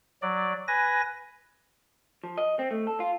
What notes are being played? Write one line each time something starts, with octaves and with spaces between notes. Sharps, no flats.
F#3 D5
B4 G#5 A#6
F3
D#5
C4
A3
A4
F4